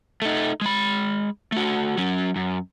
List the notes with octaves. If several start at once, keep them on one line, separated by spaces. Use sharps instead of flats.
A3 D#4
G#3 B5
A3 F#4
F#3 C#4
F#2